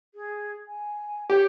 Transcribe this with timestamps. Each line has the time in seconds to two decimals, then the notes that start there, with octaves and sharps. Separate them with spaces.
0.15 G#4
0.67 G#5
1.30 G4 C#5